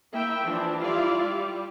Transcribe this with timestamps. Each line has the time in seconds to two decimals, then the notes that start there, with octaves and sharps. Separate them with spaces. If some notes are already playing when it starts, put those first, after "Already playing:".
0.13 A#3 E4 E5 G5
0.45 E3 F3 D4
0.83 G3 E4 F4 D5 F5
1.26 G3